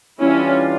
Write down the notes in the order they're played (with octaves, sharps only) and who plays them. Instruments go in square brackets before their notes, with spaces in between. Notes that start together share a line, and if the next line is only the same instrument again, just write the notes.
[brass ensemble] E3 G3 D4 F4 [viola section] C#4 E4